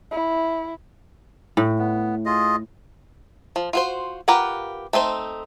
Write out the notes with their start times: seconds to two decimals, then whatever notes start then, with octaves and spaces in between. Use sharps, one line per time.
0.11 E4
1.57 A2
1.78 B3
2.26 F4 G#4 D#5
3.56 F3
3.73 F4 F#4 C5
4.28 F4 G4 A#4 B4 F#5
4.93 A3 C4 D#4 C5